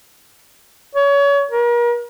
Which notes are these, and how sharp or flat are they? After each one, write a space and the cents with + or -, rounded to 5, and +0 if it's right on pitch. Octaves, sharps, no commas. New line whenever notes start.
C#5 +30
A#4 +35